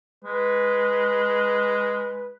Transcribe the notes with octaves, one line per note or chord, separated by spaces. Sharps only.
G#3 B4